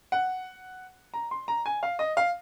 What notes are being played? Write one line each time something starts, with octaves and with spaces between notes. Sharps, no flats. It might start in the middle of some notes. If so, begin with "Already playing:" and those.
F#5
A#5
C6
A#5
G#5
F5
D#5
F5